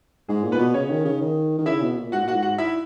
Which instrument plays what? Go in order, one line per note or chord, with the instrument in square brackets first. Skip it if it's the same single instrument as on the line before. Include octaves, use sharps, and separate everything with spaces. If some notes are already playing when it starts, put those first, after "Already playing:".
[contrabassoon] G#2 [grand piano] G#4
[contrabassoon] A#2
[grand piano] B3 B4
[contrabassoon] B2
[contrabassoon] C#3 [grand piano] C#4 C#5
[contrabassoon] D#3
C#3
D#3
D#3
[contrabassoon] C#3 [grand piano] E4 E5
[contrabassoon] B2
A#2
[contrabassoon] G#2 [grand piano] F#4 F#5
[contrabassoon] A#2 [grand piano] F#4 F#5
[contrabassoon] G#2
[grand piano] F#4 F#5
E4 E5